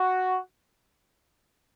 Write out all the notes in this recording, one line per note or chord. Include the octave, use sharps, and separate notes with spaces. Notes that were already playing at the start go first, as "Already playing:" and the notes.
Already playing: F#4